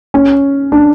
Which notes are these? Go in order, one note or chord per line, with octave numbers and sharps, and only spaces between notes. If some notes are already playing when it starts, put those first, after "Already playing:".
C#4
D4